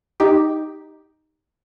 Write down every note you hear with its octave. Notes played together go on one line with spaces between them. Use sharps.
D#4 G4